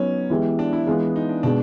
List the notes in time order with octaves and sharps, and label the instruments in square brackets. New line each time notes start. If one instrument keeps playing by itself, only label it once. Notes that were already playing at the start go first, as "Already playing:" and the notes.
Already playing: [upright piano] F#3 B3 D#4 [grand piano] C#4
[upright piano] E3 G#3 B3 E4 G4
[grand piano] D4
E4
[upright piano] E3 G#3 B3 [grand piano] F4
[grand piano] D#4
D4
[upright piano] B2 G#3 B3 [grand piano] D4